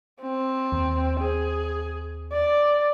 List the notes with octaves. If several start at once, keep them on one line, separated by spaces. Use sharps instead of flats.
C4
D#2
G#4
D5